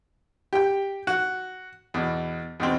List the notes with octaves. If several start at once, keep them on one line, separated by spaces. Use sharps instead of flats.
G4 G5
F#4
E2 B2
E2 B2 C4